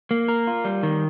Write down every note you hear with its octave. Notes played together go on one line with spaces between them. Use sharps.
A#3
A#4
F4
G3
D#3